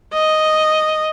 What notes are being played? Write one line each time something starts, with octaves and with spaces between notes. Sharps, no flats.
D#5